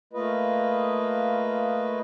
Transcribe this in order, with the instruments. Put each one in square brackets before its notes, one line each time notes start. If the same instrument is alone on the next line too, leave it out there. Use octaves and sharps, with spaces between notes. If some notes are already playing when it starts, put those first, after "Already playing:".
[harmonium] A3 A#3 F4 B4 D#5